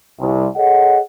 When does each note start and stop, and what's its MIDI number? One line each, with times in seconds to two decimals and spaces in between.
0.20 0.46 36
0.56 0.99 68
0.56 0.99 69
0.56 0.99 73
0.56 0.99 75
0.56 0.99 78